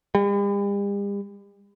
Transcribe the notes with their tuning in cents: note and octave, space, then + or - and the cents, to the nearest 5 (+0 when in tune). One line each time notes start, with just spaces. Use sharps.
G3 +45